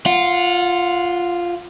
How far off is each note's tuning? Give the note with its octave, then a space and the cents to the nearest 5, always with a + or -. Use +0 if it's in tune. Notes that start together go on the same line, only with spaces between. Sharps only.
F4 +0 F#5 -30